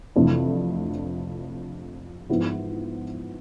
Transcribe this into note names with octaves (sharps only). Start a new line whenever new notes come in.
F2 C3 E3 A3 D4
G#2 F3 B3 E4